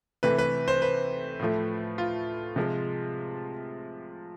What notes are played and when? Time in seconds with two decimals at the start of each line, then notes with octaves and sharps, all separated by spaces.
0.23 C3 E3 A3 B4
0.38 B4
0.68 C5
0.82 B4
1.40 A2 F3 A3
1.98 F4
2.56 C3 F3 G#3